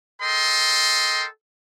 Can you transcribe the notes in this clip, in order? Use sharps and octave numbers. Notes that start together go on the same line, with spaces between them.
A4 A#4 D#5 G5 C6